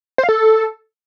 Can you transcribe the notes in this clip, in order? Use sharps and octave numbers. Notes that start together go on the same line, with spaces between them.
C5
F5
A4